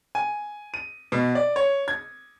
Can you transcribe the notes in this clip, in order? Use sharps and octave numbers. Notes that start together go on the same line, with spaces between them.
G#5
D#7
B2
D5
C#5
G#6